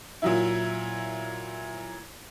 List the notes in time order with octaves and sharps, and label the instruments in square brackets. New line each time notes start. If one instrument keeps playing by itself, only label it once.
[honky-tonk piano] A#2 F#3 E4